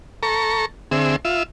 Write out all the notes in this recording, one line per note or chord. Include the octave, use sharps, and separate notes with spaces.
A4 A#5 C#6
D3 C4 G#4 E5
F4 E5